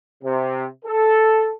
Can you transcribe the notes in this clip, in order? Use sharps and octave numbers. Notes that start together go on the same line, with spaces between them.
C3
A4